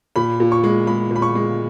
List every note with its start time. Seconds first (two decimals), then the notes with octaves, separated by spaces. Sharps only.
0.16 A#2 B5
0.40 A#2
0.52 C#6
0.64 G#3
0.87 G#3 B5
1.11 A#2 B5
1.22 C#6
1.35 G#3